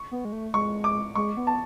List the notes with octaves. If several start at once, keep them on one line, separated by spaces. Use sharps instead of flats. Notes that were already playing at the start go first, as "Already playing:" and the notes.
Already playing: C#6
B3
G#3
A3
G#3 C#6
D6
G#3 C#6
B3
A5